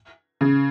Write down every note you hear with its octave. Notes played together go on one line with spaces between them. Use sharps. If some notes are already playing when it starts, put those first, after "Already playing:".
C#3